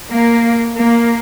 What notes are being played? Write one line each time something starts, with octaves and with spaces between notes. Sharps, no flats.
A#3
A#3